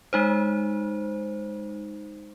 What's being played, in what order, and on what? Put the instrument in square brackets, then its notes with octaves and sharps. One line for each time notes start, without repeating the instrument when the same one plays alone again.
[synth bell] G#3 D#4 C5